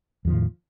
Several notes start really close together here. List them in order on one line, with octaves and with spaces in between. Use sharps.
E2 F3 D#3 A2